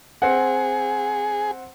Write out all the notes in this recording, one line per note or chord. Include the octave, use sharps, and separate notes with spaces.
C4 G#4 F#5